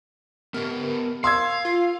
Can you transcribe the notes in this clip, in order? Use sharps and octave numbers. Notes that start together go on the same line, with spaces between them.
B3 G4 A#4 B4
F5 C6 E6 G#6
F4